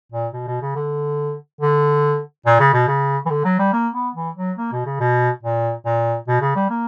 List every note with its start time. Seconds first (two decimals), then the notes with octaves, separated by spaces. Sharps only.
0.12 A#2
0.33 B2
0.48 B2
0.62 C#3
0.76 D3
1.61 D3
2.46 A#2
2.60 C#3
2.74 B2
2.88 C#3
3.26 E3
3.30 D3
3.45 F#3
3.59 G3
3.73 A#3
3.94 B3
4.15 E3
4.37 F#3
4.58 A#3
4.72 B2
4.86 C#3
5.00 B2
5.43 A#2
5.86 A#2
6.28 B2
6.41 C#3
6.56 G3
6.70 A#3